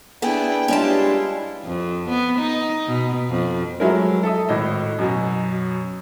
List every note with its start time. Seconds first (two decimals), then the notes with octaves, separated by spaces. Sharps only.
0.22 B3 D4 E4 G#4 G5
0.68 G3 G#3 C#4 D4 E4 F4 B4 A5
1.65 F2
2.09 B3
2.39 D#4
2.87 B2
3.29 F2
3.80 F3 F#3 G#3 A3 E4 A#4
4.23 A4 E5 D#6
4.49 G#1 A2 D#5
4.99 F#2 B2